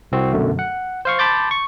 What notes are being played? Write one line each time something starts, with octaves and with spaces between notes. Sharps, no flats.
C2 C4 F#4
F#2 B2 D3 A3
F#5
C5 F5 C#6
A5 B5 C6 D6 G6 A6
C#6